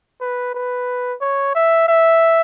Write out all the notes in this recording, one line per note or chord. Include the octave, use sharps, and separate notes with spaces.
B4
B4
C#5
E5
E5